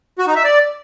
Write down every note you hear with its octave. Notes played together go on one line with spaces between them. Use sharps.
F#4
D#4
E5
D5